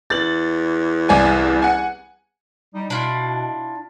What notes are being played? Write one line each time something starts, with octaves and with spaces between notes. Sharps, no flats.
E2 A6 F#7
C2 D5 G#5
F#5 G#5
G3 D#4
B2 D4 E4 F4